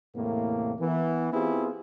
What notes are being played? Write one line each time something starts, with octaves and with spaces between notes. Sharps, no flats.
E2 A2 C3 A#3
E3 B3
B3 C4 E4 F4 G4 G#4